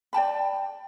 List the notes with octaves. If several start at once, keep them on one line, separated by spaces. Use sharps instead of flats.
D5 G5 A5 B5